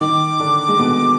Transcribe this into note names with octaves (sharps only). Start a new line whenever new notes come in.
D#3 D#4 D6
D3 D4
G#3
B2 B3